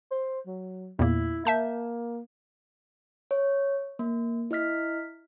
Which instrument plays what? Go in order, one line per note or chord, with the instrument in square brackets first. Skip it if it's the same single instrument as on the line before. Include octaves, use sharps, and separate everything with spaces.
[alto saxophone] C5
F#3
[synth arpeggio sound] E2 A#2 A#3 [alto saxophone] E4
[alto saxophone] A#3 [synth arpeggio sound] E5 A5 G6
[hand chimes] C#5
A#3
E4 D#5 F6 B6